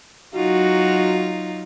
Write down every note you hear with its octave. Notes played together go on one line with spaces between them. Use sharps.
F#3 D#4 F4 F#4